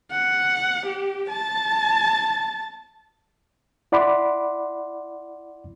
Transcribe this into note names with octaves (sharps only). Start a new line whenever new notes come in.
F#5
G4
A5
E4 D5 F#5 B5 C6 D6